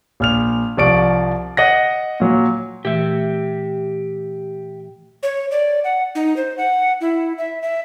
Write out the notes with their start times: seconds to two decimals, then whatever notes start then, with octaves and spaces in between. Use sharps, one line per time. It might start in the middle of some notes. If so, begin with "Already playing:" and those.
0.20 A#1 F6 F7
0.77 C2 F3 D5 C#6 D7
1.57 D#5 F#5 A#6
2.20 A#2 F#3
2.85 A#2 E3 A3 G4 E5
5.23 C#5
5.51 D5
5.84 F#5
6.15 D#4
6.37 C5
6.58 F#5
7.01 E4
7.38 E5
7.62 E5